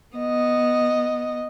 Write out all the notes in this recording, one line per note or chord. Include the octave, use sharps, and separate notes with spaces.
B3 D#5